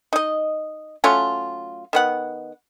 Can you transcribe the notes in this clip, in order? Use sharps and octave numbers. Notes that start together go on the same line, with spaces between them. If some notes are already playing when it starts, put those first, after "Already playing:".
D#4 D#5
F#3 A3 C#4 F4
D#3 B3 F#5